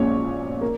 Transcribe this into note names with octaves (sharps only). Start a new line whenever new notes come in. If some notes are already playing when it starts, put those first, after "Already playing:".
Already playing: A#1 A#2 G#3 C#4 C#5
A#3